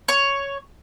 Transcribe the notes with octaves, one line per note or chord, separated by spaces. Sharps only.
C#5